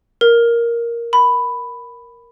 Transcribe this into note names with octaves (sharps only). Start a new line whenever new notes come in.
A#4
B5